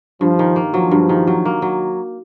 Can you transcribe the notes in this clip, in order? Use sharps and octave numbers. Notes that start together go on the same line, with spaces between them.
G2 F3
D#3
A#3
F3 F#3
G2
D#3
F#3
A#3
F#3